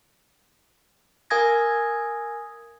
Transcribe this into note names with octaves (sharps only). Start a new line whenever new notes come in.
A#4 F5 G#5 D#6 G#6 A#6